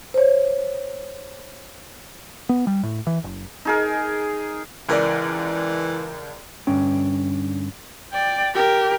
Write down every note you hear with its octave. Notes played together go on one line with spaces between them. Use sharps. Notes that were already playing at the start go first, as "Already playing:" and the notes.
C5 C#5
B3
G3
A2
E3
F#1
D#4 G#4 A#4
C#2 E3 A#4 D5
G2 D3 C#4 G5
D5 G5
G4 A#4